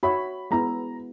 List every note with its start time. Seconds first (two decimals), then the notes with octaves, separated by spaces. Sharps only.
0.03 F#4 C#5 E5 B5
0.51 G#3 B3 E4 A#5